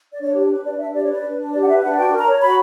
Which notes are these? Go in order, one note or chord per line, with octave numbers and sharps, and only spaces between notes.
D5
D4 C#5
G4
B4
D4 D5
D4 E5
G4 D5
C#5
B4 D5
D4
D4
G4 D5
F#5
B4 E5
D4 F#5
F#4 G5
A#4
A#5
C#5
F#4 B5